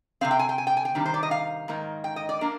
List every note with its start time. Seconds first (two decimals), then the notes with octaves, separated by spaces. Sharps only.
0.21 C3 G3 C4 F5
0.31 G5
0.39 G#5
0.49 G5
0.58 G#5
0.67 G5
0.77 G#5
0.85 G5
0.95 C3 D#3 G3 D4
1.05 C5
1.14 D5
1.23 D#5
1.31 F5
1.68 G#2 D#3 A#3 D#4
2.04 G5
2.16 D#5
2.29 D5
2.41 A#3 D4 A#4